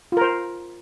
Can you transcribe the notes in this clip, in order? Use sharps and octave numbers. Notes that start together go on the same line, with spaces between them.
F4 A#4 C5